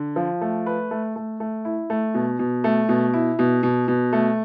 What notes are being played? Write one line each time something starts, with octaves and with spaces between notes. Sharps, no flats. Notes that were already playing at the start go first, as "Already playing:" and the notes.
Already playing: D3
F3
A3
B4
A3
A3
A3
E4
A3
B2
B2
A3
B2
E4
B2
B2
B2
A3